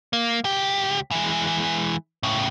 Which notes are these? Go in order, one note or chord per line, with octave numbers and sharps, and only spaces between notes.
A#3
C#2 G4
E3 G#3
A2 C#3